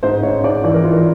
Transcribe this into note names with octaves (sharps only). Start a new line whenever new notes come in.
G#2 C5
G#2 C#5
G#2 D5
E3 D5
A#4
E3 F4